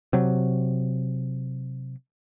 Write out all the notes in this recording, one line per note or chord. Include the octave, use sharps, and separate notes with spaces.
C3 F#3